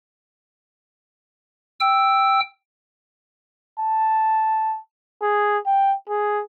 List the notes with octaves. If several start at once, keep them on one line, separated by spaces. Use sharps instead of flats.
G5 E6
A5
G#4
G5
G#4